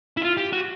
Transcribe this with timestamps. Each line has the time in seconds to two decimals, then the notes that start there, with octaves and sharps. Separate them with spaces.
0.17 E4
0.21 F4
0.37 G4
0.52 F#4